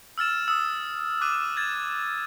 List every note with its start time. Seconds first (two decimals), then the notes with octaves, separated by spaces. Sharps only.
0.18 E6 F6 A6 E7
0.48 D#6 E6
1.21 D6 F#6 D#7
1.57 G#6 A6